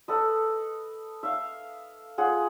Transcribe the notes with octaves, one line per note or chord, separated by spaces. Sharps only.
A4 B4 D#5
E5 F5
F4 G#4 F#5